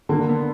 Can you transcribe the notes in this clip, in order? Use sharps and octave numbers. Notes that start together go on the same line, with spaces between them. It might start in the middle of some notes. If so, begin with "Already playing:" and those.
D3 A#3
B3